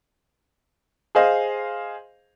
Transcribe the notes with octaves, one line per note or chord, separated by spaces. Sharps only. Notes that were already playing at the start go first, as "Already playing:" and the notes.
G#4 C5 D#5 F5